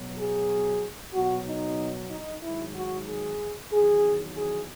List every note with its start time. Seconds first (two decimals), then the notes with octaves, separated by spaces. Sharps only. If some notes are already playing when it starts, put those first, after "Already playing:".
Already playing: B2 F#3
0.18 G#4
1.14 B2 F#3 F#4
1.47 D#4
2.11 D#4
2.43 G#2 D#3 F#3 E4
2.75 F#4
3.08 G#4
3.73 E2 D#3 F#3 G#4
4.37 G#4